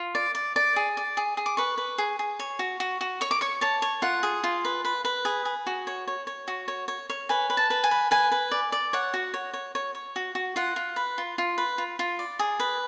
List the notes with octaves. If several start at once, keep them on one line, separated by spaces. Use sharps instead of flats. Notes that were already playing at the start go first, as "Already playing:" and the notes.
Already playing: F4
D5
D5
D5
G#4
D5
G#4
G#4
D6
B4 C#6
B4
G#4
G#4
C#5
F#4
F#4
F#4
C#5 C#6
D6
C#5 C#6
C#5 A5
C#5
F4 F#5
G#4
F4
B4
B4
B4
G#4
G#4
F#4
C#5
C#5
C#5
F#4
C#5
C#5
C#5
B4 G#5
B4
A5
B4
G#5
B4
B4 G#5
B4
D5
D5
C#5 F#5
F#4
C#5
C#5
C#5
C#5
F#4
F#4
F4 F#5
F4
B4
F4
F4
B4
F4
F4
D5
G#4
B4